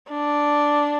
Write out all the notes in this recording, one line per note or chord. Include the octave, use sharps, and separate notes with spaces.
D4